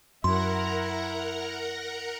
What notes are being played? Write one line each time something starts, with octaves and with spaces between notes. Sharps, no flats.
F#2 E4 A#4 F#5 A#5 C6